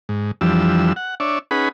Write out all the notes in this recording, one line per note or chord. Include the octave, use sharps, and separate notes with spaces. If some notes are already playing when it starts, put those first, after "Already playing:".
G#2
F2 E3 F3 G3 D4 E6
F#5
D4 C#5 D5 E5
C#4 D#4 G#4 B4 F#5 B5